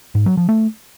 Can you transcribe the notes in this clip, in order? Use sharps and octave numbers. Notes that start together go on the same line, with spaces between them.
G#2
F#3
F3
A3